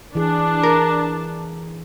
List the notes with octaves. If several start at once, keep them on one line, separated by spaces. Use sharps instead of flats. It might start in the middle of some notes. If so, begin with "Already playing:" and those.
E3 D4 G#4 A5
A#4